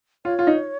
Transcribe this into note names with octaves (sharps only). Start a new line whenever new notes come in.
F4 C#5
F4
D#4